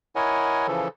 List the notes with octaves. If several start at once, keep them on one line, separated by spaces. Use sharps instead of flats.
E4 A#4 C#5 D#5 F#5 G#5
C#3 E3 F3 A4